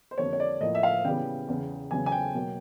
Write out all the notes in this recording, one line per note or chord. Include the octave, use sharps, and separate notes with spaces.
C5
F2 D3 G3 A#3 C#5
C#5
D5
A2 F3 A#3 D#5
E5
F5
C#3 E3 G3 B3 G5
E2 C#3 E3
E2 C#3 F#3 B3 G#5
G#5
G5
B2 F#3 A#3